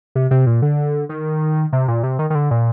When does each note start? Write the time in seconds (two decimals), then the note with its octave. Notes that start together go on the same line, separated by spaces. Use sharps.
0.15 C3
0.31 C3
0.47 A#2
0.62 D3
1.09 D#3
1.73 C3
1.88 A#2
2.03 C3
2.19 D#3
2.30 D#3
2.35 D3
2.51 A#2